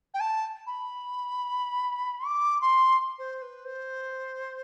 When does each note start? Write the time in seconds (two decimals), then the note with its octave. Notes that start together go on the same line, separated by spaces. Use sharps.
0.14 G5
0.20 A5
0.67 B5
2.27 D6
2.61 C6
3.18 C5
3.42 B4
3.65 C5